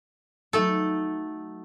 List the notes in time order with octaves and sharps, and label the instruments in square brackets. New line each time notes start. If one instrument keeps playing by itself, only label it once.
[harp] F#3 D#4 [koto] A3 A4